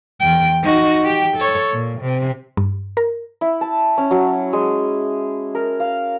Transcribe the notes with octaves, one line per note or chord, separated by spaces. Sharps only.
E2 G5
D#4 F#4
G4 G5
A4 C#5
A#2
C3
G2
A#4
E4
A5
C#4
F#3
G#3
A#4
F5